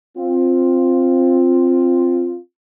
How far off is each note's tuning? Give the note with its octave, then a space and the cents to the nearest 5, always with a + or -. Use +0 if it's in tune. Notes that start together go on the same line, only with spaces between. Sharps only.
C4 +5 F4 +0